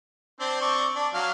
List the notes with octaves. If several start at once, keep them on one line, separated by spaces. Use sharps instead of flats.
C4 D4 C5
C4 D5 C#6
D4
F#3 F5